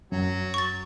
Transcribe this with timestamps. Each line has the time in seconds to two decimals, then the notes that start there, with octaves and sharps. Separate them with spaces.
0.12 F#2 F#3
0.54 C#6 A6